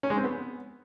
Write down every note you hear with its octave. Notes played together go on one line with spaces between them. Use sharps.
C#4
G#3
C4
B3